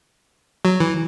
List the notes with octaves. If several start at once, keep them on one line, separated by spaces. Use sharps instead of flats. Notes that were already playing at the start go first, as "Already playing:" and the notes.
F#3
E3